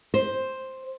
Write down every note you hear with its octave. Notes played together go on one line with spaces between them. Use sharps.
C5